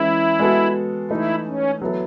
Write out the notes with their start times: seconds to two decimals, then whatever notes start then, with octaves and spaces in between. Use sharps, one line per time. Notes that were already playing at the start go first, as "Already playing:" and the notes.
Already playing: E3 G#3 C#4 E4
0.39 G#3 B3 F#4 A4
1.10 E3 A3 D#4 E4
1.46 C#4
1.82 F#3 B3 E4 A4